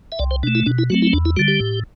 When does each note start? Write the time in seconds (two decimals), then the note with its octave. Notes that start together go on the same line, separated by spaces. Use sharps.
0.12 E5
0.19 C2 D5
0.31 C5
0.43 B2 D4
0.47 A3
0.55 E4
0.66 B2 D4
0.78 E4
0.90 F#3 A3 C4 F#4
1.02 E4
1.13 E2 D4
1.25 E4
1.37 D3 G3 F#4
1.48 G4
1.60 A2